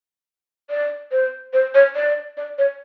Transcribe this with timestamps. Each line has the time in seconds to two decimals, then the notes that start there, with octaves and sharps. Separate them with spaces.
0.70 D5
1.12 C5
1.53 C5
1.74 C#5
1.96 D5
2.37 D5
2.58 C#5